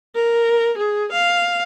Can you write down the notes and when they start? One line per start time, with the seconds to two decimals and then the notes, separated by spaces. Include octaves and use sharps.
0.15 A#4
0.78 G#4
1.12 F5